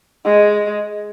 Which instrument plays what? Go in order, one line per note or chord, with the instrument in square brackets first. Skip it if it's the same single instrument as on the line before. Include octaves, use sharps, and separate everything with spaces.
[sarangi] G#3